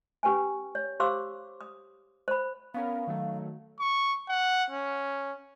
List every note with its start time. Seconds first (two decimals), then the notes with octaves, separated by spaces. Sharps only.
0.23 C#4 G4 B4 G5 G#5
0.75 C#5
1.00 G4 C5 F5 C6 D6 E6
1.61 D#6
2.28 C5 B5
2.74 B3 C#4 A#4 F5
3.07 D#3 F#3 A3
3.80 C#6
4.29 F#5
4.70 C#4